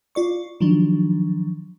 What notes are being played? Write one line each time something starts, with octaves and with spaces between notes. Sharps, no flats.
F4 D5 C#6
D#3 F3 F#3 D4